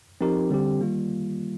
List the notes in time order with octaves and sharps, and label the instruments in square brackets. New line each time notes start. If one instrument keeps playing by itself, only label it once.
[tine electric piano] F3 C4 D#4 G4 A#4
D3 G3 C4 G4
D#3 G3 A#3 F4